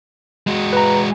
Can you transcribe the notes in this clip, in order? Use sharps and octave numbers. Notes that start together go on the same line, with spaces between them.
G#3 F#4
B4 A#5